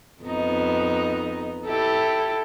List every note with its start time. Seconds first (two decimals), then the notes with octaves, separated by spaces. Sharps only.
0.23 F2 B3 D#4
1.65 E4 G4 A4